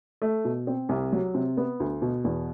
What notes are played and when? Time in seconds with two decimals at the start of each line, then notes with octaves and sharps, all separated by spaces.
0.22 A3
0.45 B2
0.67 C4
0.89 C2
1.12 F#3
1.35 C3
1.57 B3
1.80 D2
2.02 B2
2.24 E2